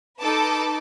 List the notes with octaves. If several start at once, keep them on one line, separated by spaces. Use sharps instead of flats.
D#4 A4 B4 A5 D6